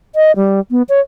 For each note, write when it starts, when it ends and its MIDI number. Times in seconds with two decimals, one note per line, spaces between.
0.15 0.32 75
0.36 0.60 55
0.71 0.82 59
0.89 1.00 73